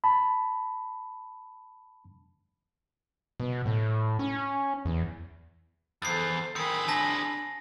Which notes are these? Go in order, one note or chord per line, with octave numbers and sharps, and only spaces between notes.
A5 B5
B2
A2
C#4
E2
E2 A4 C5 A6 C7
D#3 C4 G#4 B5 C#7
D4 G#5 A5 A#6